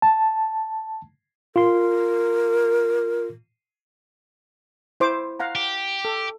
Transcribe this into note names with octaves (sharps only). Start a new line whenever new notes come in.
A5
F4 A#4 C6
E4 C5 D6
F5 F#5 A#5
G4
A4